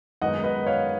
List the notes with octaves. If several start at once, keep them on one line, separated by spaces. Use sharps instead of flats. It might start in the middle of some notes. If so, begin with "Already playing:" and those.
F#2 D#3 G#3 B3 D#4 D#5 F#5
B4 D#5
C#5 F5